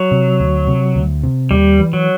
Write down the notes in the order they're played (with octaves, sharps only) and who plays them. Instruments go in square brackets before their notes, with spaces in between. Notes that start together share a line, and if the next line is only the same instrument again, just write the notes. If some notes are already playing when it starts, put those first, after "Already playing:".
Already playing: [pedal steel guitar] F#3
[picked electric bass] C3
D2
C3
D2
C3
[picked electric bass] D#2 [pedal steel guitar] G3
[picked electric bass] E3
[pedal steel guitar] F#3